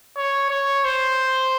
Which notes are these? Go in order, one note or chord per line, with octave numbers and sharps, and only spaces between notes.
C#5
C#5
C5